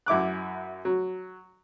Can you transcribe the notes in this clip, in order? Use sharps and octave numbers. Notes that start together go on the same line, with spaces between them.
F#2 E4 D6 F#6
F#3